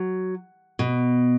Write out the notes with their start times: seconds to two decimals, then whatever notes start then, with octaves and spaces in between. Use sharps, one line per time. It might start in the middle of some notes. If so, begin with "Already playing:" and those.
Already playing: F#3
0.79 B2